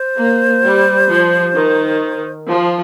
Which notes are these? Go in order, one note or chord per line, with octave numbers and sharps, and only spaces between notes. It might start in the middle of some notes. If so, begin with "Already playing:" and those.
Already playing: C5
A#3
G3
F3
D#3
F3